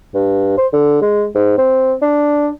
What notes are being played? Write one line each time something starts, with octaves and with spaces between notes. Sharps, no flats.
G2
C5
D3
G#3
G#2
C4
D4